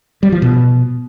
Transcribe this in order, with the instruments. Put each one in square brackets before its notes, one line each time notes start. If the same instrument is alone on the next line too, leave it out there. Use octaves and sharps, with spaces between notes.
[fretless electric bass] G3
F3
B2